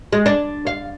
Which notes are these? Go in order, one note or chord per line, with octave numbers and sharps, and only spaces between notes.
G#3
D4
F5